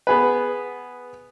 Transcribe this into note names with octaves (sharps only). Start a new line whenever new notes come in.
B3 G#4 B4